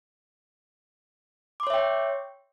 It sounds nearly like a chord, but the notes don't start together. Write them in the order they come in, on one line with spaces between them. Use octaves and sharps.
D6 C6 C#5 E5 G5